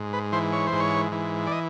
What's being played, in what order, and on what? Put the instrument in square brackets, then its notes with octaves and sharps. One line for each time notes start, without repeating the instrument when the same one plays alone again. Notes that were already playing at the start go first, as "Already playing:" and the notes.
Already playing: [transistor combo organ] G#2
B4
E3 C5
C#5
C5
G#2
C#5
E3
D5
D#5